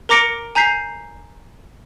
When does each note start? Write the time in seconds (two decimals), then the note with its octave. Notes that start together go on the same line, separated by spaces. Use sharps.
0.09 A#4 A#5 D6 A#6 C#7 D7
0.55 G#5 A#5 G6 B6 C7